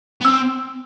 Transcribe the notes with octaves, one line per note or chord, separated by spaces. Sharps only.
B3
C4 E6